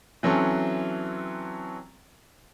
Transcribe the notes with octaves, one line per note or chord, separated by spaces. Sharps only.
E3 F#3 C4 C#4 A4